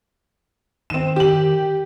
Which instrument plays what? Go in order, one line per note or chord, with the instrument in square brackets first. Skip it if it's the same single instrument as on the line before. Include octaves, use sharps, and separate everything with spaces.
[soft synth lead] D#3 [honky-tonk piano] C4 E7
[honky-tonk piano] G4 F#7